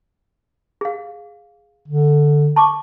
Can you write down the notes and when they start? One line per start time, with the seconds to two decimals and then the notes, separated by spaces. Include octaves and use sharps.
0.81 G#4 F5
1.88 D3
2.56 A5 C#6 D6